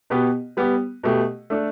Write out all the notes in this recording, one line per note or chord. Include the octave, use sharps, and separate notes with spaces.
B2 B3 G4 B4
G3 B3 G4
B2 A3 G4
A3 D4 A4